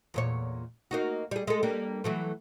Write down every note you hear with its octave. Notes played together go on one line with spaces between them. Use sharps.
E2 A#2 C#5
A#3 D#4 F#4
G3 G#4
G#3 A4
G3 A#3 D4
E3 F#3 A3